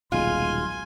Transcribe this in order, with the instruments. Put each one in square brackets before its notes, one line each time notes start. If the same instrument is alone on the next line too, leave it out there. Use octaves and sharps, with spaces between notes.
[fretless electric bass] D#1 B1 G#3 [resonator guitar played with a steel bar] F4 [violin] G#5 [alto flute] C6